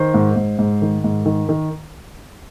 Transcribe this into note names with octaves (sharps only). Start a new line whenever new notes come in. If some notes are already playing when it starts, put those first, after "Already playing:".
Already playing: D#3 C5
G#2
G#2
G#2
D#3
G#2
D#3
D#3